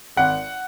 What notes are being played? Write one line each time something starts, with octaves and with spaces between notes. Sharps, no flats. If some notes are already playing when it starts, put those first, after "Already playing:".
G#1 F#5